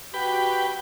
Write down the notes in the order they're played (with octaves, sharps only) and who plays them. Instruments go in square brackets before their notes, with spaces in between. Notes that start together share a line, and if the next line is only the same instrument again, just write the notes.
[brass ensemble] F#4 G4 [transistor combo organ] B4 G5